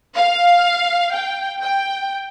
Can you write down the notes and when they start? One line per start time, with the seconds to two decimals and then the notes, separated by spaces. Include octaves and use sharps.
0.14 F5
1.14 G5
1.59 G5